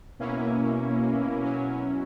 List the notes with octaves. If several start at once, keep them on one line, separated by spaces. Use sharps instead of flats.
B2 A#3 C#4 E4
B2 F#3 C#4 E4